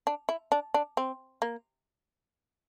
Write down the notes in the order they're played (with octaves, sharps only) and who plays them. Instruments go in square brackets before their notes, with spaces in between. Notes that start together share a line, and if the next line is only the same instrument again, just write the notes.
[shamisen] D4
E4
D4
D4
C4
A#3